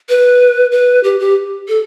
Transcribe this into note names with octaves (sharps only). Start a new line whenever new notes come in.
B4
B4
G4
G4
A4